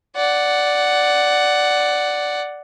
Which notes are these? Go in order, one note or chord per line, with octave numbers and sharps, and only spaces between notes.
D5 F#5